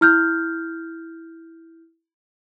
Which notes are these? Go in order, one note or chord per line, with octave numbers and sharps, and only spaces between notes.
E4 F6 G6